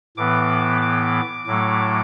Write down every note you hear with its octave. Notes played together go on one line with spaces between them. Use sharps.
A2 E3 B3 D6
D6
A2 F#3 A3